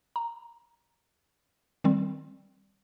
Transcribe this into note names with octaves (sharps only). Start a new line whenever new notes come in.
A#5
D#3 G3 C4